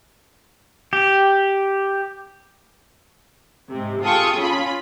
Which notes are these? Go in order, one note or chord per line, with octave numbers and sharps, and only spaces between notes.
G4
G#2 C3
F4 G#4 A4 G5 C#6 D#6
C#4 F4 B5